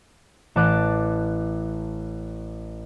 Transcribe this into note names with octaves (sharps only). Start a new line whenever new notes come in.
A1 A5 D6 F#6